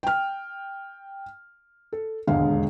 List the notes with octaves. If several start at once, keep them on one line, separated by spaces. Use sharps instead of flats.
G5 F6
A4
E1 D#2 G#2 D3 F5